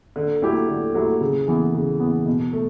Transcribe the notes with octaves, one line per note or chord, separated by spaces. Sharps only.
D3
F#3 A3 E4 G4
D3
F#3 A3 E4 G4
C#3
E3 B3
C#3
E3 B3
B2
A3